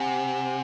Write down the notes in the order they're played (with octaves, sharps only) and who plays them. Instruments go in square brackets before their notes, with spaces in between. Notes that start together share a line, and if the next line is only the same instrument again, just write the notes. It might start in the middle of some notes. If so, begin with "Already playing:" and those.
Already playing: [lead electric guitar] C3 [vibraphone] F#5 G#5